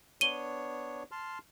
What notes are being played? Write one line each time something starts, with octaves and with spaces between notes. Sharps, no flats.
B3 D4 C#5 D#7 G7
A5 C6 F6